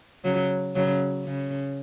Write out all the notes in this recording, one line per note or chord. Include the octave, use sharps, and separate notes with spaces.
C#3 F#3
C#3 F#3
C#3